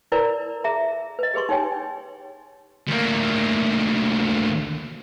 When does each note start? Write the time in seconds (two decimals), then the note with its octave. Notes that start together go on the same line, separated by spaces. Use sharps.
0.12 E4 A#4 B4 D5 A#5
0.64 G#4 E5 A#5
1.19 B4 D#5
1.34 G4 G#4 B4 C6 C#6
1.49 D#4 G4 C#5 G5 G#5
2.87 D2 A#3